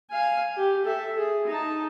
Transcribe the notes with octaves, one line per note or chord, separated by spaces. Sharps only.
F5 G#5
G4
A4 E5
G#4
D#4 A5